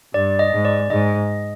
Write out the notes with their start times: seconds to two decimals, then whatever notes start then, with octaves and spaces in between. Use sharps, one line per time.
0.14 G2 D5
0.39 D#5
0.52 G#2
0.65 D5
0.90 G#2 D#5